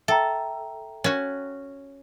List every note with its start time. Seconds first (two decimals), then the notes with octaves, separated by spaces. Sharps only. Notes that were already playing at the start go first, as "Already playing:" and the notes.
0.08 A4 E5 G5 A#5
1.04 C#4 F#4